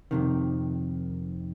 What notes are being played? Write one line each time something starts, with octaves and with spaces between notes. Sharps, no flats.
F2 C3 D#3